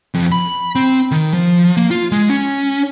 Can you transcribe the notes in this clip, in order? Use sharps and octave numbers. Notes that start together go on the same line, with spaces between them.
F2
B5
C4
D#3
F3
A#3
F4
G#3
C#4